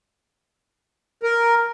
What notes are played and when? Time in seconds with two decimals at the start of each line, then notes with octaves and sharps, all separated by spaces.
1.23 A#4